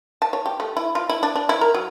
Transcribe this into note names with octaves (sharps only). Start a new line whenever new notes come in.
A5
C#5
G4
A3
E4
F4
E4
D4
D4
E4
A#4
F#3